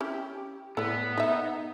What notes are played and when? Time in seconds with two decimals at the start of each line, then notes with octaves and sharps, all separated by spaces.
0.01 C#4 E4 G4
0.77 A2 B3 A4 D5
1.18 D#4 D#5 E5